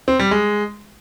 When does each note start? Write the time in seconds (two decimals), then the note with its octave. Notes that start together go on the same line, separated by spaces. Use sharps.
0.08 C4
0.19 G3
0.31 G#3